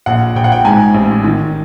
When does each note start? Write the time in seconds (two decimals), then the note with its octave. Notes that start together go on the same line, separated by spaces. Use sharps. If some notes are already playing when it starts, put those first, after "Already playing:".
0.06 A#1 F#5
0.35 A#1 G5
0.44 F#5
0.52 G5
0.65 G#2 G#5
0.94 A1
1.24 D#3